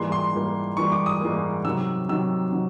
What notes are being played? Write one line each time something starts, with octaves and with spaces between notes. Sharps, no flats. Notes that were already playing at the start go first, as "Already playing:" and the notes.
Already playing: G#2 E3 G3 A#3 C6
C6
G#2 E3 G3 A#3
G#2 E3 G3 A#3 C#6
D6
D#6
G#2 E3 G3 A#3
C3 D#3 F#3 E6
C3 D#3 F#3 E6
C3 D#3 F#3